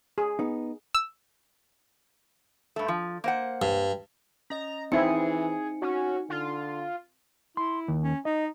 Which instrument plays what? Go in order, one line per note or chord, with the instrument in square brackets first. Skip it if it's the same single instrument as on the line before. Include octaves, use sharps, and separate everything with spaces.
[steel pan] G#4
[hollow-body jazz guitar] B3 D#4
[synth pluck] E6
[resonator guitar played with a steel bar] G2 A3
F3
A#3 C5 F#5
[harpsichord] G2
[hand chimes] C#4 D#5 [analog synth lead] A#5
[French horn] E3 [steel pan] C4 E4 [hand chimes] D#4 G#5 C#7 [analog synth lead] G#4
[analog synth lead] C#4 [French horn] F#4
[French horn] D3 [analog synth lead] F4
[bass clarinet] E4 [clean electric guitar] C6
[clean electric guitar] D#2
[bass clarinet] C#4
[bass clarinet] D#4 [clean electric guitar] D#5